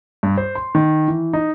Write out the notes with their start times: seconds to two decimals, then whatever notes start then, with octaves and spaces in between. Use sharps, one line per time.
0.23 G2
0.38 C5
0.55 C6
0.75 D#3
1.08 E3
1.33 D#4